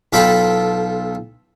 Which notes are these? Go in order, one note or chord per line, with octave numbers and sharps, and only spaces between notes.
B1 F4 A4 G5 B5